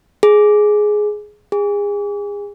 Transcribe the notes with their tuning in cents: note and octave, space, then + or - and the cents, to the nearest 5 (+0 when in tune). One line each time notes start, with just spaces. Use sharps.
G#4 +10
G#4 -30